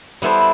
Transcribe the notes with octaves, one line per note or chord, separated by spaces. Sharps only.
G3 B3 E4 A4 C5